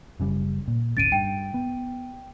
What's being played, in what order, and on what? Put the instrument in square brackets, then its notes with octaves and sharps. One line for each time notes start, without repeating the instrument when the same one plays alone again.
[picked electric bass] F#1 C#3 G3
A#2
[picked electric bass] D1 G1 C#4 [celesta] A6 D7 D#7
[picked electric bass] G2 [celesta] G5
[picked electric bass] B3